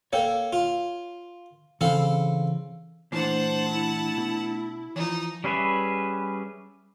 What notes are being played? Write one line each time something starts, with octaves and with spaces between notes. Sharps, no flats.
A#3 A4 C#5 G5
F4
C#3 E3 C4 A4 F5
A#2 E3 A3 D4 C5 F#5 A5
E4
B2
E3 F3 D#4
G3 C#4 G#4 B4 E5